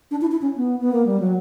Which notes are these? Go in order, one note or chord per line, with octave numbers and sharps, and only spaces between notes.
D4
E4
E4
C#4
B3
B3
A#3
G3
F#3